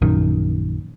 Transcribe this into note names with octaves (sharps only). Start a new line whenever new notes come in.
A#1 F#2 D#3